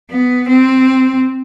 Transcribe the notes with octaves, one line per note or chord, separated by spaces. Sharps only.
B3
C4